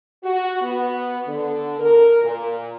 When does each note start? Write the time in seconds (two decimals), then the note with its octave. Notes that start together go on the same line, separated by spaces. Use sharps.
0.24 F#4
0.61 B3
1.28 D3
1.79 A#4
2.23 A#2